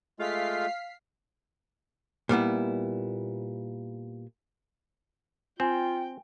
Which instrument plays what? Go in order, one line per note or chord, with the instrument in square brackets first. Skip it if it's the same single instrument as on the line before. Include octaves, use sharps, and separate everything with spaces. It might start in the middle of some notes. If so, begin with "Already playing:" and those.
[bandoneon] G#3 A3 F4 [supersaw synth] F5 B6 C7
[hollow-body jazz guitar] A#2 G3 B3 E4
[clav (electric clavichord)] C4 [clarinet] F4 [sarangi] G5 [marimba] G#5